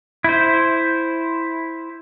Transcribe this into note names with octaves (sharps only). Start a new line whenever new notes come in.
E4 C5